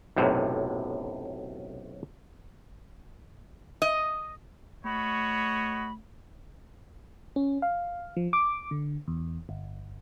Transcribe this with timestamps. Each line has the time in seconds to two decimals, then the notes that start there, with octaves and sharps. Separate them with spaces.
0.16 B1 F#2 A2 C3
3.82 D#5
4.85 A3 F#4 C#5 D#5 B5
7.36 C#4
7.62 F5
8.17 F3
8.33 D6
8.71 D3
9.08 E2
9.49 G1